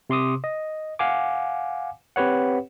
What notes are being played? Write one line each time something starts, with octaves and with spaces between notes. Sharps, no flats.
C3 C6 D6 D#6
D#5
F5 F#5 G#5 D6
C4 G4 B4 C#5 F#5